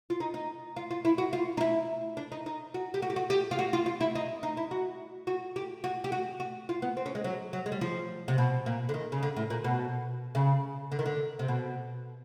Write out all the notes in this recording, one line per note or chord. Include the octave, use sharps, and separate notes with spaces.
F4
D#4
D#4
F4
F4
E4
F#4
F4
D#4
E4
D4
D#4
D#4
F#4
G4
F#4
G4
F#4
G4
F4
F#4
F4
F4
E4
D#4
D#4
E4
F#4
F#4
G4
F#4
G4
F#4
F#4
F4
B3
C4
C#4
G#3
F#3
F#3
G#3
G3
F3
C3
B2
A#2
D3
D#3
C#3
D3
A2
A#2
B2
C#3
D3
D#3
D3
C3
B2